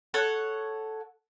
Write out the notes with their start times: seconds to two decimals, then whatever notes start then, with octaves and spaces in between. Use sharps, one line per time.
0.14 A4 C#5 F#5